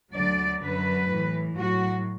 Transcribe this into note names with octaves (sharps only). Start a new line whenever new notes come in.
D2 D3 F#3 D5
F#2 D3 F#3 B4
A2 E3
A2 F#3 F#4